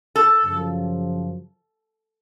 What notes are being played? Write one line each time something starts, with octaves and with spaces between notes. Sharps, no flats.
A4
F#2 C#3 F3